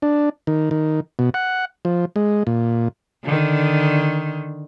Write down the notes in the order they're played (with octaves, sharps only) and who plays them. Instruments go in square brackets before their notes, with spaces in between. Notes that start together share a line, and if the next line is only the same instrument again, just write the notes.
[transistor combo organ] D4
D#3
D#3
B2
F#5
F3
G#3
A#2
[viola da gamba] D3 D#3